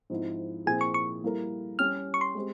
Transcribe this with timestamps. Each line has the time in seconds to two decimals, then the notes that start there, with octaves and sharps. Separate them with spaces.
0.10 G#2 F3 C4 E4
0.66 A#2 F3 C4 E4 G#4 G#5
0.81 C#6
0.94 C#6
1.23 G3 A#3 E4 A#4
1.79 G3 C#4 G4 F6
2.14 C#6
2.21 C6
2.35 G#3 C4 G4